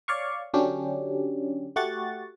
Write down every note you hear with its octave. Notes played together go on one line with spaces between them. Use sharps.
C#5 D5 F5 C#6
D3 F#3 C#4 D4 G4
A3 F#4 G4 F#5 C#6 A6